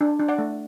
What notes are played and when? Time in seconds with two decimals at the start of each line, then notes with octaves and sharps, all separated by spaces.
0.01 D4
0.19 D4
0.28 D5 F#5
0.38 A3